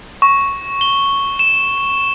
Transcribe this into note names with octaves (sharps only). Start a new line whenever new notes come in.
C#6
G7
E7